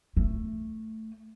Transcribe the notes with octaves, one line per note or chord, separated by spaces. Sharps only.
A3